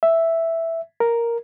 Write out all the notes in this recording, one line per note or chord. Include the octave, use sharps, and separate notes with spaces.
E5
A#4